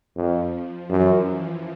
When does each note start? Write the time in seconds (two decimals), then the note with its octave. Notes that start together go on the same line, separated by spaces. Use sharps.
0.16 F2 F3
0.89 F#2 E3
1.25 F3